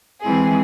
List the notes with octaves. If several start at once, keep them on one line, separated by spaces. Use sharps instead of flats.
E3 G#3 C4 E4 G#4